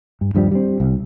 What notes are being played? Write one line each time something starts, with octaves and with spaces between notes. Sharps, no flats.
G2
D#1 G2 F3 G3
G3 C4
C2